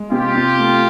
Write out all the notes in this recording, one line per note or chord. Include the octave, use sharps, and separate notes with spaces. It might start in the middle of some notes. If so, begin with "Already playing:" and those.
Already playing: G#3
C3 F4 G4
C3
A3